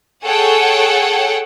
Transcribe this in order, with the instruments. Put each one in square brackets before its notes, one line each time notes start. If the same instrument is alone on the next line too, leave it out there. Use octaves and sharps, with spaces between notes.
[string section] G#4 A4 C#5 F#5 G5